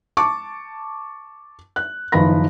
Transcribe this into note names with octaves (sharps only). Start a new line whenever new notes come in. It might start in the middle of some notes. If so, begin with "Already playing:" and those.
A5 C#6 D6
F#6
F#1 D#3 F3 B4 B5 A#6